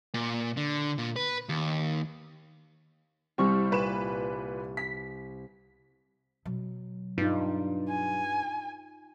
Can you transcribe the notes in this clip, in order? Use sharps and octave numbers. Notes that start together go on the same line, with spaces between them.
A#2
D3
A#2
B4
D#2
C2 G3 C4 C#6 F6
A#2 B4 E7
B6
B2 F#3
G2 D#4 F4
G#5